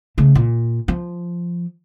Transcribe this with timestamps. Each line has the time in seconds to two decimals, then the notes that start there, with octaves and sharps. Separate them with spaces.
0.18 C#3 A3
0.35 A#2
0.88 F3